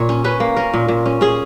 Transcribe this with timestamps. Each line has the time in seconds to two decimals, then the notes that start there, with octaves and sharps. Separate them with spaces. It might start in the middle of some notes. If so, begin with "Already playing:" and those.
Already playing: A#2 C#5
0.09 C#4
0.24 C#4 B4
0.40 A#3
0.56 C#4 A#4
0.74 A#2
0.88 A#2
1.06 C#4
1.21 C#4 G#4